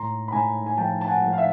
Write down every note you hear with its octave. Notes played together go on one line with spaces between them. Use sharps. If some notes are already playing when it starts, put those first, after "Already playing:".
Already playing: A2 A#5 C6
B5
A2 G#5 A#5
G#5
F3 G5 A5
A5
F#5 G#5
F3
F5
E5